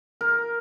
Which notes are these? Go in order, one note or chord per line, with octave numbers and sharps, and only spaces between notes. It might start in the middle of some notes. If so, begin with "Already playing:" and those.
A#4